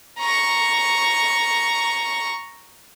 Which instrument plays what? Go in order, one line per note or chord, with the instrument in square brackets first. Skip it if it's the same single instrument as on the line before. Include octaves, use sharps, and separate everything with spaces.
[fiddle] A#5 C#6